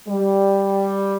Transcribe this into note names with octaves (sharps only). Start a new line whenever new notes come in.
G3